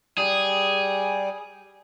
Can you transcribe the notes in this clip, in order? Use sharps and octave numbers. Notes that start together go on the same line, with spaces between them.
G3 G#4